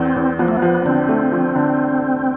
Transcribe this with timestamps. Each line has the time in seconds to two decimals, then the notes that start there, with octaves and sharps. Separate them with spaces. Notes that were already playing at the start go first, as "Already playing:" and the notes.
Already playing: E2 C4
0.16 E2
0.39 F3 B3
0.48 A3
0.57 B3
0.62 F3
0.85 D3 C4
1.09 A3
1.32 F3
1.55 D3